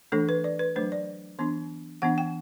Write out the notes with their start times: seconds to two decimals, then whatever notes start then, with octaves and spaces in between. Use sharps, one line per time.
0.12 E3 A3 D4 A4
0.29 B4
0.44 D5
0.59 B4
0.76 F#3 A3 D4 C5
0.92 D5
1.39 E3 B3 D4 C6
2.02 E3 B3 D4 F#5
2.18 G5